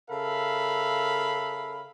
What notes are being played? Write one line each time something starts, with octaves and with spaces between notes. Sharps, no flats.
C#3 A4 A#4 E5 F5 B5